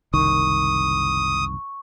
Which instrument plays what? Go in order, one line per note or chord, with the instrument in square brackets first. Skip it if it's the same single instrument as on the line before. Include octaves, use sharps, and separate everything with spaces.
[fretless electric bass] F#1 C2 D#3 [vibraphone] C#6 [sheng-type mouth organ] D#6